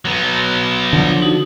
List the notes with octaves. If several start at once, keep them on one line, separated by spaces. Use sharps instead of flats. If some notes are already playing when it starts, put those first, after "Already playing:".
F#3 B3
D3 F3
D#4 F#4